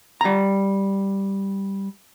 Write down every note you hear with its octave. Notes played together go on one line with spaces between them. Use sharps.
G3 A#5